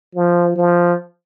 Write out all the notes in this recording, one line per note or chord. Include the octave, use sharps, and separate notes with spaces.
F3
F3